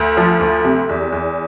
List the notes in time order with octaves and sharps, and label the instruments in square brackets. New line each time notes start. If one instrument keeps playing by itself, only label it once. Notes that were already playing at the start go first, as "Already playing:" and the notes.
Already playing: [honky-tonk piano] D2
F3
D2
C3
E2
E2